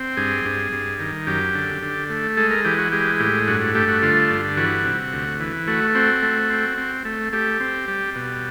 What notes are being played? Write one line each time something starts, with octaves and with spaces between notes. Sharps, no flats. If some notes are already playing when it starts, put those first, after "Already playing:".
Already playing: C4
G2 G#4
G2
G2
D#3
F#2 G4
D3
D3
A3
G#3 A4
A#4
E3 G4
F#4
G#3 G4
A2 G4
G2 F#4
F#4
A3 G4
F#4
D3 F4
G2
E3 F#4
C3
D2
E3
A3 F#4
C4 F#4
A3
C4
C4
A3
A3 G4
C4
G3
B2